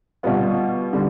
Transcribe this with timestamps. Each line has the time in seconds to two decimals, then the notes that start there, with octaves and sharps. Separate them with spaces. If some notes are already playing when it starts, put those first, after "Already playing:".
0.23 B2 G3 B3 F4
0.93 D3 G3